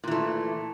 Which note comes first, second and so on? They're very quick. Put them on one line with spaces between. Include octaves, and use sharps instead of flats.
A#2 E3 A3